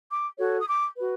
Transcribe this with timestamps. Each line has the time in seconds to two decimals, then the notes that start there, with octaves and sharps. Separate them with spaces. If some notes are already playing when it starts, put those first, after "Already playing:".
0.09 D6
0.38 F#4 A4 C#5
0.59 D#6
0.67 D6
0.96 F#4 B4